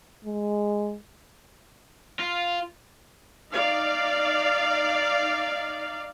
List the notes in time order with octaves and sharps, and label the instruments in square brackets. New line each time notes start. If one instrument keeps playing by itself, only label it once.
[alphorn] G#3
[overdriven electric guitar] F4
[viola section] D#4 D5 F5